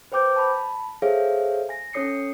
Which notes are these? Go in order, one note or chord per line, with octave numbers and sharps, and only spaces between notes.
B4 C5 G5 D6 G6
A5 B5
G#4 A4 C5 C#5 E5 F5
G#5 A#6
C#4 A4 C#5 D#6 C7 C#7